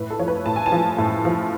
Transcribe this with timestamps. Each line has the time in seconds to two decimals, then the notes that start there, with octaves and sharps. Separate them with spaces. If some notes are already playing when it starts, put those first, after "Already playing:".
Already playing: A2 B4
0.10 A4
0.19 F3 C#5
0.28 B4
0.46 A2 A5
0.56 G#5
0.66 A5
0.72 F3
0.98 A2
1.25 F3